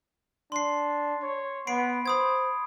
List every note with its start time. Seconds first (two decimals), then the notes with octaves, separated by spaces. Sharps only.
0.52 D4 C6 C7
1.23 C#5
1.67 B3 B5 C7 D7
2.06 C5 B5 D#6 G#6